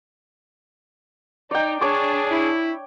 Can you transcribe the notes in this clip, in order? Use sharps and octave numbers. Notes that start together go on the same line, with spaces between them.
D#4 D5 G5
D4 G#4 C#5 D6
E4